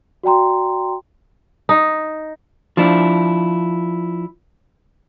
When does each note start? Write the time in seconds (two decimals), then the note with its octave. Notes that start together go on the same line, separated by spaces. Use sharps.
0.23 F#4 D5 G5 A#5 C6
1.69 D#4
2.77 F3 D4 E4